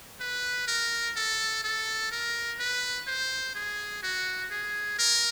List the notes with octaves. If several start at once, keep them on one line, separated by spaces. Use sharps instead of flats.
B4
A#4
A4
A4
A#4
B4
C5
G#4
F#4
G#4
A#4